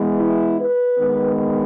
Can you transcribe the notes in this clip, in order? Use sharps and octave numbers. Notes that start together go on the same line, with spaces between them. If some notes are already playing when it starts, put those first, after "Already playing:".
Already playing: E3 G#3 B3
E4
B4
D#3 G#3 B3